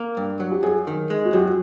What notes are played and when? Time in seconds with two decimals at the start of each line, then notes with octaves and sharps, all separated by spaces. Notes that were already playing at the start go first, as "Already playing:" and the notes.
Already playing: A#3
0.17 G2
0.40 F#3
0.52 G4
0.63 F#2 G#4
0.87 D#3
1.10 G#3
1.25 F#4
1.33 F#2 G4
1.41 F#4